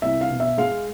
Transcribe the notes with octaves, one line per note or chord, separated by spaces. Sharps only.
C2 E5
F5
B2
E5
G#3 F5